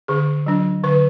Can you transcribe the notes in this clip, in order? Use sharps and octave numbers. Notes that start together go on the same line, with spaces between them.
D3 G#4
F#3 D4
D3 B4